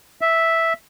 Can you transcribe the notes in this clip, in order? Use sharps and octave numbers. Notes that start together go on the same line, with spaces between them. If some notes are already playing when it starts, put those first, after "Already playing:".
E5